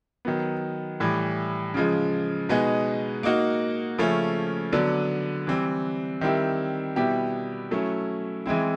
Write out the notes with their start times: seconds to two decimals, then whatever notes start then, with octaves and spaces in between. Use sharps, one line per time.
0.25 D#3 F#3 B3
1.00 A2 E3 G3
1.74 C#3 F3 G#3
2.49 B2 G#3 B3 D#4 G#4
3.23 A#3 D#4 F#4
3.98 C#3 F3 A3 C#4
4.72 D3 F#3 B3 D4
5.47 E3 G3 C4
6.21 D#3 G3 C4 E4 G4
6.96 B2 G3 B3 E4 G4
7.71 F#3 A3 C#4 E4
8.46 E3 G#3 C4 E4